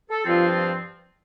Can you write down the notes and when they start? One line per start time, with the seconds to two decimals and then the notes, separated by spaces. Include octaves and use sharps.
0.09 A4
0.26 G2 F3 C4 F4
0.49 F4